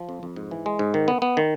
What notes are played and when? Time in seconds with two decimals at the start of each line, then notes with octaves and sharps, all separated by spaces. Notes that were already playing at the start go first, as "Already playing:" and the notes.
Already playing: F3
0.09 F2
0.23 F2
0.36 G#2
0.51 E3
0.66 G#3
0.79 G#2
0.94 D#3
1.08 B3
1.22 B3
1.37 D#3